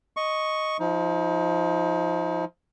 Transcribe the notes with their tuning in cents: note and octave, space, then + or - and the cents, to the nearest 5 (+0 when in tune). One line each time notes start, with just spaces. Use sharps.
D#5 +0 C#6 +0
F3 +0 D#4 +30